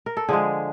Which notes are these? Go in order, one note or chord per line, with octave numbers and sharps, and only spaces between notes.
A#4
A4
D3 F3 G#3 G#4